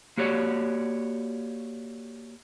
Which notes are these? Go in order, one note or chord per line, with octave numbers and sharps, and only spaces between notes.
A#3 F#4 G4 C#5 D5